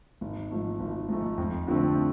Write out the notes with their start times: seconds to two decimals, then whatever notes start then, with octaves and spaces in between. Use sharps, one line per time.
0.21 G#1
0.51 G#2 F3 A3
0.80 G#1
1.09 G#2 F3 A3
1.38 F2
1.67 D3 F3 A3 C4